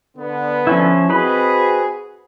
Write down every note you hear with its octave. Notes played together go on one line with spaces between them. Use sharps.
D3 B3
F3 C#4 E4
C4 F#4 G#4 B4 D#5 B5